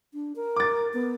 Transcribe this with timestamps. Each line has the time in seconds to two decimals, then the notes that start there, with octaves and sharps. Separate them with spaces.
0.14 D4
0.36 A#4
0.56 D6 A6
0.94 B3